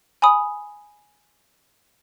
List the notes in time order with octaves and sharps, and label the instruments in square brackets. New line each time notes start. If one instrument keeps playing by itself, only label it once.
[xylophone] G#5 B5 D#6